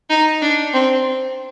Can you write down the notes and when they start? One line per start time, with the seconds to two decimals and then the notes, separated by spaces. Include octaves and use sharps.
0.10 D#4
0.42 D4
0.73 C4